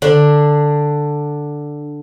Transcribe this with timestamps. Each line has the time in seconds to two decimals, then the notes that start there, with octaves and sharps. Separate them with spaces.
0.02 D3 D4